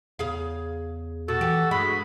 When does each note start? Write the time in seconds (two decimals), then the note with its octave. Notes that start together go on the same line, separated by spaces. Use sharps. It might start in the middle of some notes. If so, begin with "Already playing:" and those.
0.19 E2 C#3 G#4 F5
1.28 B2 F#4 A4
1.41 E3 G4
1.71 G2 G#3 B5